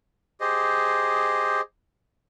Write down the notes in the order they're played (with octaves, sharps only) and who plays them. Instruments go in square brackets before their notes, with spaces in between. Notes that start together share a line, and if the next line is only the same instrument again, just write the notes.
[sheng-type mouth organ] G4 G#4 C5 D#5